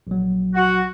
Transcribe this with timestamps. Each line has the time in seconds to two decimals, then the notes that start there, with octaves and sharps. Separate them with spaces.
0.07 A#1 F#3
0.55 F#4